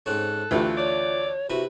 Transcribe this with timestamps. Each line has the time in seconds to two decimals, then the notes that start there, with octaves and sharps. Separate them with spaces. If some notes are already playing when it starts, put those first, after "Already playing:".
0.06 G#2 C4 C#4 A4 F#6
0.51 D2 E3 A3 F4 G4
0.77 C#5 D5
1.50 C3 E4 F#4 B4